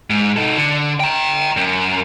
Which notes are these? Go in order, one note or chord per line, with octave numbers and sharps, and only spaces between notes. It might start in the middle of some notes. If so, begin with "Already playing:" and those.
G#2
D#4 A4
D3
G5 A#5
F#2